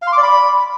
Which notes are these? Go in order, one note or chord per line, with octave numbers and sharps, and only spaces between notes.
F5
C6
D6
D5
B5